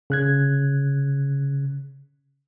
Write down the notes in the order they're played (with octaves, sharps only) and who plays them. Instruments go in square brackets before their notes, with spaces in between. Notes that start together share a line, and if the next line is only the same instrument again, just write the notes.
[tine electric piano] C#3 F#6 G#6